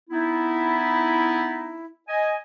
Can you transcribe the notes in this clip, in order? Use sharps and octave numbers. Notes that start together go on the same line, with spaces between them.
B3 D#4 E4
D#5 G#5